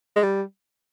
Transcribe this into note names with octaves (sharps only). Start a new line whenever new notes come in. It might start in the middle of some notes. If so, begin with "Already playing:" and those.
G#3
G3